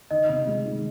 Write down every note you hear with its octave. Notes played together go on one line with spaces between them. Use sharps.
D#3 D#5
C3
G#3
D#3